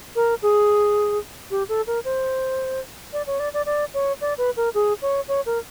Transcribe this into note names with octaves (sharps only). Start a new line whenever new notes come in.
A#4
G#4
G4
A4
A#4
C5
D5
C#5
D5
D5
D5
C#5
D5
B4
A#4
G#4
C#5
C#5
A#4